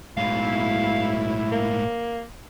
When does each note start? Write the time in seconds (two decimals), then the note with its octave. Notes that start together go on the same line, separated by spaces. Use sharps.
0.17 B1 A2 G#3 E4 F5
1.52 A#3